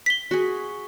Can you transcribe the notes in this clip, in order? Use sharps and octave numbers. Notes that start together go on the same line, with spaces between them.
B6 G7
F#4 G#4